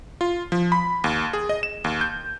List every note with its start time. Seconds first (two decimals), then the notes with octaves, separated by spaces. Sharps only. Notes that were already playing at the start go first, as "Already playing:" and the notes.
0.21 F4
0.52 F3
0.72 B5
1.04 D#2
1.33 G#4
1.49 D#5
1.63 E7
1.84 D#2
2.01 G6